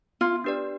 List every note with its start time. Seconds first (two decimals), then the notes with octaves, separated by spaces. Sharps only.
0.21 B3 F4
0.44 D4 G4 B4 D5